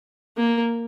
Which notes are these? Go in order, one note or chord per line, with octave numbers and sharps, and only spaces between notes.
A#3